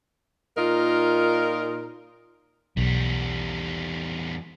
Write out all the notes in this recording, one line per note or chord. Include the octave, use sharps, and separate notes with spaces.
A#2 D#4 F4 A#4
B1 E2 G3